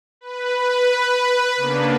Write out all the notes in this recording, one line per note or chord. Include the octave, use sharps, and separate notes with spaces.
B4
C#3 A#3 B3 D4